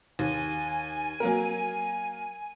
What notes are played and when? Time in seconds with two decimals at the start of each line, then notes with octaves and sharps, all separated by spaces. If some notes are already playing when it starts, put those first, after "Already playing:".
0.19 D#2 G#5
1.20 F#3 A#3 A#4